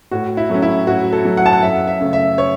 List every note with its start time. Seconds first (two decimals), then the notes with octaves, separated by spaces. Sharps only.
0.11 A2 F#4
0.37 E4
0.50 F#3 A3 C#4
0.62 E4
0.87 A2 F#4
1.13 A4
1.25 F#3 A3
1.37 F#5
1.46 A5
1.53 F#5
1.62 F#2 E5
1.87 E5
2.00 C#3 A3
2.13 E5
2.38 C#5